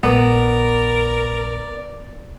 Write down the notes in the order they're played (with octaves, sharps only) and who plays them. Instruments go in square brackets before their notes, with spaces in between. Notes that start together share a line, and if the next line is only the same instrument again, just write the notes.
[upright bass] A#1 [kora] B3 [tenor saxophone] A#4 [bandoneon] D5